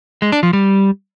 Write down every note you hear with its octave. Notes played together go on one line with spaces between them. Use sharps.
G#3
D4
F3
G3